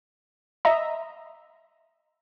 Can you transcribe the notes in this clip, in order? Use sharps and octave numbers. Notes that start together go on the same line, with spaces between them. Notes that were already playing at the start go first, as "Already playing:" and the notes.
D#5 E5 A#5